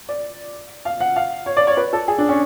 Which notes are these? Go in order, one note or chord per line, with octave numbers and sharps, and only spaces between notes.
D5
F5
F#5
F5
C#5
D5
C#5
B4
A4
G#4
D4
C#4